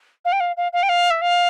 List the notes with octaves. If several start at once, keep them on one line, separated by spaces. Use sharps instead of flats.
F5
G5
F5
F5
F5
G5
F5
E5
F5